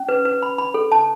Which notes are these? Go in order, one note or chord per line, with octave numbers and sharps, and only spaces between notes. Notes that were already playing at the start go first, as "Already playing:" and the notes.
Already playing: C#4
B4
B4
B5
B5
A4
A5